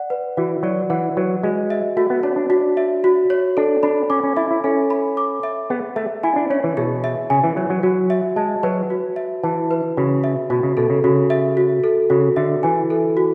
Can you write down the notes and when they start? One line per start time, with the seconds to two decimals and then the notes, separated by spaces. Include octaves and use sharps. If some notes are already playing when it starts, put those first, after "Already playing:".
Already playing: D5 F#5
0.10 B4
0.37 E3 F#4
0.63 F#3 D5
0.90 E3 F#5
1.17 F#3 B4
1.43 G#3 F#4
1.70 E5
1.97 A3 F#4
2.10 B3
2.23 D4 C#5
2.36 D4
2.49 D4 F#4
2.77 E5
3.04 F#4
3.30 C#5
3.57 D4 A4
3.83 D4 B5
4.10 C#4 D6
4.23 C#4
4.37 E4 E5
4.51 E4
4.64 C#4 A4
4.90 B5
5.17 D6
5.43 E5
5.70 B3 G#4
5.96 A3 E5
6.23 E4 G#5
6.36 D4
6.50 C#4 C#5
6.64 E3
6.77 B2 G#4
7.04 E5
7.30 C#3 G#5
7.44 E3
7.56 F#3 C#5
7.70 F#3
7.83 F#3 F#4
8.10 E5
8.36 G#3 A5
8.63 F#3 B4
8.90 F#4
9.16 E5
9.43 E3 A5
9.71 B4
9.97 C#3 F#4
10.24 E5
10.50 B2 F#4
10.63 C#3
10.77 B2 A4
10.90 C#3
11.04 C#3 F#4
11.30 E5
11.57 F#4
11.84 A4
12.10 C#3 F#4
12.36 D3 E5
12.63 E3 G#5
12.90 A4
13.17 F#4